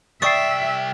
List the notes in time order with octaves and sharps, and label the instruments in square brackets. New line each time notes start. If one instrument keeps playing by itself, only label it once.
[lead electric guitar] C2 G5 [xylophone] D5 C#6 D#6 [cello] E5 [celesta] A6 C7